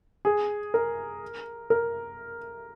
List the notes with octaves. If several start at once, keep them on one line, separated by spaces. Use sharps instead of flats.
G#4
A#4
A#4